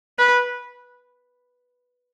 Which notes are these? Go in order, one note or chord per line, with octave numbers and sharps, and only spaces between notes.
B4